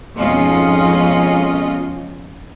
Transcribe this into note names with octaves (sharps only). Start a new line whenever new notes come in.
F2 G#2 B2 C#4 F4 D#5